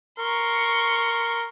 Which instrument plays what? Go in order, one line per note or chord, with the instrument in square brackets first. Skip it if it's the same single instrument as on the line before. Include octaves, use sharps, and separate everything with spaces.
[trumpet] A#4 [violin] C6 C#6